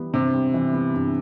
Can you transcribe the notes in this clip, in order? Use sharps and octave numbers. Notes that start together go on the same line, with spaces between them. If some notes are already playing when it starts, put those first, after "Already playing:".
Already playing: E3 G3 B3
G2 C3
G3
E3
B3
G2